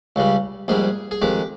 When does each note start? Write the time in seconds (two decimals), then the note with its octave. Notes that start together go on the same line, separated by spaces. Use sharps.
0.16 C#2 C#3 G3
0.68 A#1 G#2 G3 G#4
1.11 G#4
1.22 F2 D#3 G#3 G4